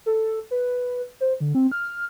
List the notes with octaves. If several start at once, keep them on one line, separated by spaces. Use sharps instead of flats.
A4
B4
C5
D3
C4
F6